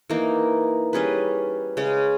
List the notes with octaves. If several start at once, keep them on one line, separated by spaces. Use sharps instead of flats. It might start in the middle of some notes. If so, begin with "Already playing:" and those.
E3 A#3 D#4
G3 C#4 G#4 B4
C#3 G#3 C#4